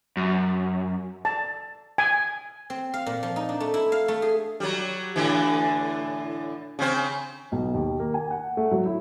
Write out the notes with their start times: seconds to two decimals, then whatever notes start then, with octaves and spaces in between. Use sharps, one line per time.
0.17 F#2
1.25 A5
1.98 G#5
2.70 C4
2.94 F5
3.06 A#2
3.23 F3
3.36 D#4
3.49 D4
3.60 A3
3.74 E4
3.92 F5
4.08 A3
4.22 G#4
4.60 F#3 G3
5.16 A2 D3 E3
6.79 C#3 C4
7.52 B1
7.74 D#2
7.99 A#3
8.14 G#5
8.31 F#5
8.57 A3
8.71 F#3
8.85 E4